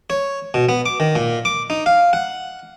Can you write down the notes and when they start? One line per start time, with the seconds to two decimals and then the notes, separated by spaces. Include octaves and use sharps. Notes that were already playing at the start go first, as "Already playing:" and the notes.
0.10 C#5
0.54 B2
0.69 B3
0.86 D6
1.00 D#3
1.15 A#2
1.45 D6
1.70 D#4
1.86 F5
2.13 F#5